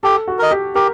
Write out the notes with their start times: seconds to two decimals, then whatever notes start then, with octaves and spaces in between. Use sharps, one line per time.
0.03 G4 A4
0.28 F#4
0.39 A#4 D#5
0.51 G4
0.75 G4 A#4